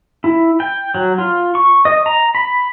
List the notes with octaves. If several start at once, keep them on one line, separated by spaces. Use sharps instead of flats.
E4
G5
F#3
F4
C#6
D#5
A#5
B5